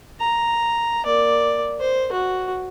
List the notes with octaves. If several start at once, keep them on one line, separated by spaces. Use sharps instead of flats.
A#5
A#3 D5
C5
F#4